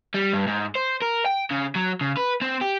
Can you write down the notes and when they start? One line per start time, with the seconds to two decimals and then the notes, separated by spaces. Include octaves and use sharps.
0.14 G3
0.33 G2
0.48 G#2
0.75 C5
1.02 A#4
1.26 G5
1.51 C#3
1.76 F#3
2.01 C#3
2.17 B4
2.41 C4
2.62 G4